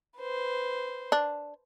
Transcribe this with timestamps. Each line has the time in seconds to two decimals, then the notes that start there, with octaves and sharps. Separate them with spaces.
0.18 B4 C5
1.12 D4